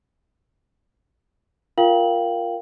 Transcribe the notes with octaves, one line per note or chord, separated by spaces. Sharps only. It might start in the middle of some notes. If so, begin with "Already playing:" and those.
F4 A#4 F5 G5 F#7